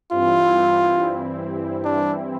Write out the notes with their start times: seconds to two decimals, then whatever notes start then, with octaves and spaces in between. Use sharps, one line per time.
0.11 G2 E3 G3 C4 E4 F4
1.85 D4